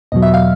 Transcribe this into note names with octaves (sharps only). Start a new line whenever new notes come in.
E2 B2 F#3 D#5
E5
F5